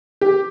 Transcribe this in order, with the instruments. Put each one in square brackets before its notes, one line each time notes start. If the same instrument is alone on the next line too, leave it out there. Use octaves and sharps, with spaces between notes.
[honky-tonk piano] G4